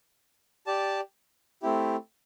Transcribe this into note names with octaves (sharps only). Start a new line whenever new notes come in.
G4 D5 A5
A3 C4 E4 G4